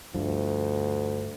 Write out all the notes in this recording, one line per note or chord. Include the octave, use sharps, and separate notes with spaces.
D2 G2 F3